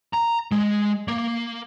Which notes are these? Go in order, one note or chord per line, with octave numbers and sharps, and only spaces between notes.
A#5
G#3
A#3